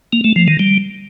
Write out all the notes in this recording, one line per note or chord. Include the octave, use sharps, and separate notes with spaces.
A#3
A3
F3
D#3
G3